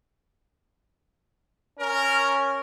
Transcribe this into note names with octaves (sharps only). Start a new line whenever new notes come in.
C#4 A#4